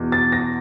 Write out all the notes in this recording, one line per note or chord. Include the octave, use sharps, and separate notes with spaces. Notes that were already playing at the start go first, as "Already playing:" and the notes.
Already playing: E2 B2
A6
A#6